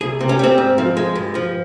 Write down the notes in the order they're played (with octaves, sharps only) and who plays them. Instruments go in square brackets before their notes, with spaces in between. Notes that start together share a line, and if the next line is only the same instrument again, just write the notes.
[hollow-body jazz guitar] C2 G#4
C3
C#4
G3 C4
G#2
F3
G#3
G2
F3